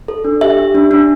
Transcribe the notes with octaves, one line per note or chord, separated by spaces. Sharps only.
A4
D4
G4 E5
G4
D4
D4